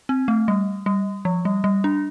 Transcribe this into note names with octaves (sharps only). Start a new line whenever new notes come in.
C4
A3
G3
G3
F3
G3
G3
D4